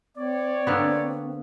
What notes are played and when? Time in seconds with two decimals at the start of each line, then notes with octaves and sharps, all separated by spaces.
0.16 C4 C#5 D5
0.67 D3 A#3 B3